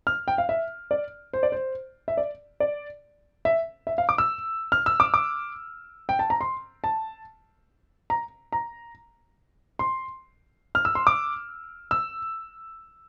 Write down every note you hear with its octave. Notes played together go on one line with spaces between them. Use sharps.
F6
G5
F5
E5
D5
C5
D5
C5
E5
D5
D5
E5
E5
F5
D6
E6
F6
E6
D6
D6
G5
A5
A#5
C6
A5
A#5
A#5
C6
F6
E6
C6
D6
E6